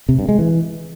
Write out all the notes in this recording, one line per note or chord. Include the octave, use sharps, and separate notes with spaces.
C3
G2
G#3
E3